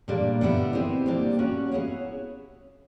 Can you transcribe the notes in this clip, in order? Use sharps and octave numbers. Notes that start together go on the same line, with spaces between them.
A#2 G3 A#3 D4
D3 G3 B3 E4
C4 E4 G4 C5 D#5
A#2 G3 A#3 D4 G4
A#3 C#4 F#4 B4
B3 E4 G#4 C#5 F5